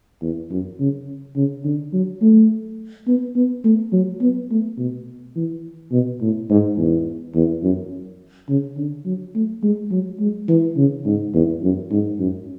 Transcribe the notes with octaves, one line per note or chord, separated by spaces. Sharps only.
E2
F#2
C#3
C#3
D3
F#3
A3
B3
B3
A3
F#3
B3
A3
B2
E3
B2
A2
G#2
E2
E2
F#2
C#3
D3
F#3
A3
G#3
F#3
G#3
E3
C#3
G#2
E2
F#2
G#2
F#2